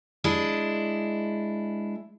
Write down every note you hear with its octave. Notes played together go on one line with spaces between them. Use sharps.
G#3 D4 E4